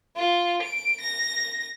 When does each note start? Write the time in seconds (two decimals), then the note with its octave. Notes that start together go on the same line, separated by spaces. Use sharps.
0.16 F4
0.62 D7
1.00 A#6